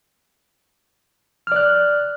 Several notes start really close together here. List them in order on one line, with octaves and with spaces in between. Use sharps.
F6 D5 F#6